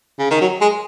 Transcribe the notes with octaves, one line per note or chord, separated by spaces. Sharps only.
C#3
D#3
F#3
G#3